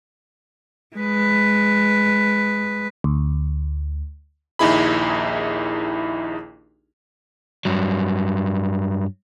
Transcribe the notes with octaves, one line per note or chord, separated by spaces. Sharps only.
G#3 B4
D2
A#1 D#2 D#4 E4 G#4 B5
G2 F#3